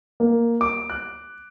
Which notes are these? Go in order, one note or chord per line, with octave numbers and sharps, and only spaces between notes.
A#3
D6
F#6